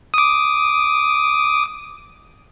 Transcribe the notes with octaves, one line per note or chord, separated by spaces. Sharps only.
D6 D#6